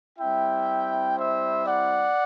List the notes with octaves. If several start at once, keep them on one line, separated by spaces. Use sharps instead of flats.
G3 C4 E4 E5 G5
C5 E5
D5 F#5